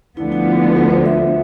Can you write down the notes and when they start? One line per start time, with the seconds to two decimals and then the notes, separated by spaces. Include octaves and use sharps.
0.17 D2 D3 F3 B3 E4
0.32 E4
0.46 F4
0.76 F4
0.90 C5
1.06 E5